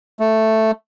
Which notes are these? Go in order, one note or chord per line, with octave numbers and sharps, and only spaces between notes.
A3